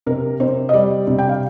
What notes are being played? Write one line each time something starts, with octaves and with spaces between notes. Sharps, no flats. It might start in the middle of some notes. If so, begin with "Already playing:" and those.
C3 A#4
C3 C5
D#5
G3 D5
C3
G5
F5